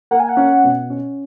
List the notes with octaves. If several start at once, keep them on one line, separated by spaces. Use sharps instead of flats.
A#3 F#5
G#5
F#5
C#4
B2
C#4